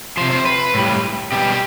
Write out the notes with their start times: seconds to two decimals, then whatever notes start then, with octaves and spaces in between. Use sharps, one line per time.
0.17 C3 F3 C5
0.31 C5
0.46 B4
0.74 A2 G3
1.32 B2 G3 G4